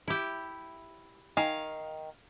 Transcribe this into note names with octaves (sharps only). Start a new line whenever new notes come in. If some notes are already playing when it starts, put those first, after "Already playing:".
E4 G4
D#3 F5 G#5